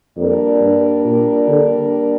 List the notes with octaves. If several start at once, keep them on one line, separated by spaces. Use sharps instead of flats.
F2 G3 A#3 D4 A#4 D5
G2
A#2
D3